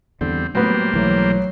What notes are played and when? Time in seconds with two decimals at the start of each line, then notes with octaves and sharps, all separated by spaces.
0.21 E2 D3 G3 C4
0.55 A2 F#3 G3 A#3 B3 C5
0.94 B1 E3 F#3 A3